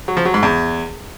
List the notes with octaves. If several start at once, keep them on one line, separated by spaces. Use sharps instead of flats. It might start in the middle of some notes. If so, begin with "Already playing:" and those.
F#3
F3
F#3
G#2
E2